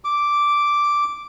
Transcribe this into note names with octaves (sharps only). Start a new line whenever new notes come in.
D6